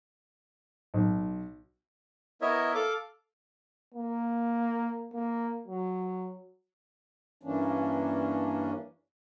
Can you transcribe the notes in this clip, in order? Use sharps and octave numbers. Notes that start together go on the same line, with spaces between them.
B1
B3 E4 A#4 C#5 D#5 E5
A4 F5 D6
A#3
A#3
F#3
G2 E3 A#3 C#4 D4